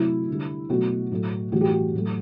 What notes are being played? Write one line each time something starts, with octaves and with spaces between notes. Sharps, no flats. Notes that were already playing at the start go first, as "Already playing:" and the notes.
Already playing: C3 F#3 A3 E4
D3 G3
B2 F#3 A3 F#4
A2 F#3 A3
A2 E3 G3 F#4
G4
F#4
A2 F#3 A3